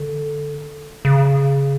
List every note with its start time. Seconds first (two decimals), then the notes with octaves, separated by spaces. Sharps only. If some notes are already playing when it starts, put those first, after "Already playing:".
Already playing: D3
1.05 C#3